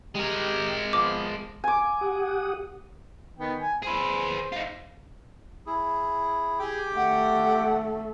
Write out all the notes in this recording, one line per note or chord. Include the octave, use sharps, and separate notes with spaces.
G#3 G4 A#4
F3 B3 D6
G#5 D6
G4 F#5 D#6
D#3 B3 G5
G#5
G#4 B4 C5
D#4 F4
E4 G#4
G4 G#4 G5 D6
A3 F#5